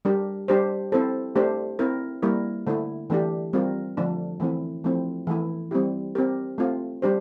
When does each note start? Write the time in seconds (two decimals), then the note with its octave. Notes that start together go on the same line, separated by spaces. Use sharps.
0.05 G3 D4 G4 A#4
0.48 G3 D4 G4 C5
0.92 C4 E4 A4 C5
1.35 A3 D4 G4 C5
1.79 C4 E4 A#4
2.22 G3 A#3 E4 A#4
2.67 D3 A3 E4
3.10 E3 A3 D4 G4
3.53 G3 C4 F4 A#4
3.97 D3 F3 A3 D4
4.40 E3 A3 C4 E4
4.84 F3 A3 C4 E4
5.27 E3 A3 E4
5.71 G3 C4 E4 G4
6.15 C4 G4 A#4
6.58 A3 C4 F4
7.02 G3 D4 G4 C5